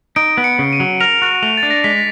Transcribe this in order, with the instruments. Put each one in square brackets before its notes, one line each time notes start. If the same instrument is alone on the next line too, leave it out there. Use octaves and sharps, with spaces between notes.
[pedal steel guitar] D#4 [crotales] D7
[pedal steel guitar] B3
[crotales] C#7
[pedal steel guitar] C#3
[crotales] D#7
[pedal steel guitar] F#3
[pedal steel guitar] A#4 [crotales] F7
[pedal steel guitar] F#4
[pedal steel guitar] A3 [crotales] F7
[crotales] A6
[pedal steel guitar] D4
[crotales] A#6
[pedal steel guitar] G#3 [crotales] B6